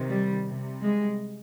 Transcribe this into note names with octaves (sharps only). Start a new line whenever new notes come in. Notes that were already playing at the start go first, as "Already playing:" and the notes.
Already playing: C3 D#3
G3
C3 G3
G#3